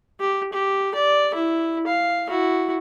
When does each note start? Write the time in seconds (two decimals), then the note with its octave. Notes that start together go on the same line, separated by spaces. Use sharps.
0.20 G4
0.53 G4
0.95 D5
1.34 E4
1.87 F5
2.28 E4 F#4